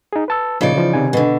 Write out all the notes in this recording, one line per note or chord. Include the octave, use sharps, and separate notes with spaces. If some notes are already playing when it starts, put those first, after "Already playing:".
D#4 G#4
B4 A5 E6
A#2 C#3 F3 D#4 D5
E3 F3
C3 D#3 G#5
B2 D3